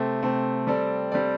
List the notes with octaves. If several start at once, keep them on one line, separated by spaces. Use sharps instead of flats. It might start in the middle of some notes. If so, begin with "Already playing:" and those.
Already playing: C3 A3 C4
C3 A3 C4
G3 C4 A4 D5
G3 C4 A4 D5